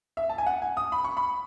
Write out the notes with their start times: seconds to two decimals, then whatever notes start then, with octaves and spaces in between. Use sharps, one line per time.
0.17 E5
0.29 A5
0.38 G#5
0.47 F#5
0.62 G#5
0.77 D#6
0.92 B5
1.04 C#6
1.17 B5